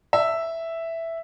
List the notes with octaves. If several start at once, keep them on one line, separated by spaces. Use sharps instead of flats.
E5